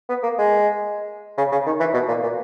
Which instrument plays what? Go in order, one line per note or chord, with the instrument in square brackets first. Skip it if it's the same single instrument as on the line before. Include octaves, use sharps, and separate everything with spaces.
[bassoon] B3
A#3
G#3
C#3
C#3
D#3
E3
B2
A#2
A#2